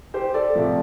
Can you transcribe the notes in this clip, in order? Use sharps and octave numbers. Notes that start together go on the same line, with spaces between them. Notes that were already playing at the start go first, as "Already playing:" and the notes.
G4 C5
A4 D5
C3 F3 A3